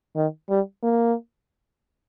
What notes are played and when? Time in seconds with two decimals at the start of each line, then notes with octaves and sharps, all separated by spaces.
0.16 D#3
0.50 G3
0.83 A#3